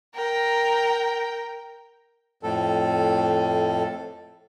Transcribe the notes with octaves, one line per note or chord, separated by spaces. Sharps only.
A#4 G5
F2 A2 A4